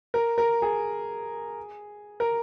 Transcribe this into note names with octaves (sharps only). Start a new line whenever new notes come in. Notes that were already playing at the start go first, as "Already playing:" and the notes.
A#4
A#4
G#4
A#4